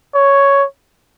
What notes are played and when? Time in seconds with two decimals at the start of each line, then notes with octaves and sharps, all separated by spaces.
0.14 C#5